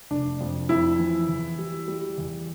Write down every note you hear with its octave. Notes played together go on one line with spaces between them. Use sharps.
F1 D4
F2
F2 E4
E3
E2
G3
G3
E2